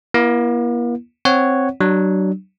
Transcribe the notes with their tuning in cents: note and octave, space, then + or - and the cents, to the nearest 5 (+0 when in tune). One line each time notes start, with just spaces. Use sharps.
A#3 +45 E4 +20
C4 +0 C#5 +0 F#5 +0
F#3 +35 D4 +25